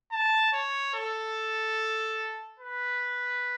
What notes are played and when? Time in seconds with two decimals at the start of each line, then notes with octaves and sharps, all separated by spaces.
0.11 A5
0.53 C#5
0.94 A4
2.59 B4